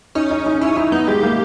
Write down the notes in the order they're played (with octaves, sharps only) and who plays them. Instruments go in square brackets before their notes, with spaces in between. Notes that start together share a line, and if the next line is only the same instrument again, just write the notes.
[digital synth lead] C#4 [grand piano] D#4
[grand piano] D#4
D#4
[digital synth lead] C#4 [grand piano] E4
[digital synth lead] D#4 [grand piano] E4
[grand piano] B3 [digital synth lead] D#4
[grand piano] G#3 [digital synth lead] G4
[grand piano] A#3